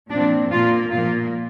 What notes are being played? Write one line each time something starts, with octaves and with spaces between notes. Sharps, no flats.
A#2 F3 C4 D4
A#2 A#3 F4
A#2 F3 A#3 F4